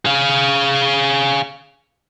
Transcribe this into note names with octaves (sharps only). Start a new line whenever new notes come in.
G#4 F5